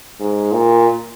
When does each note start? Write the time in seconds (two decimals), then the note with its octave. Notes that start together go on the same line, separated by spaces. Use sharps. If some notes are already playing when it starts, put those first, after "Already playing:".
0.20 G#2
0.53 A#2